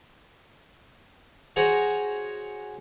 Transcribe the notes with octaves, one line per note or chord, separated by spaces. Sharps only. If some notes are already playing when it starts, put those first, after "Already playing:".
F#4 G#4 C5 C#5 F#5 A#5